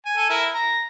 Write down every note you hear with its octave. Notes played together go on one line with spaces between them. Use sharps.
G#5
A4 G#5
E4 A#4
A#5